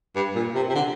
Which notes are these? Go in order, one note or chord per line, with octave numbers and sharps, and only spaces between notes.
G2
A#2
C3
C3
D3